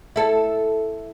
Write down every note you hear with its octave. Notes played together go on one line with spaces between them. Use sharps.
E4 A4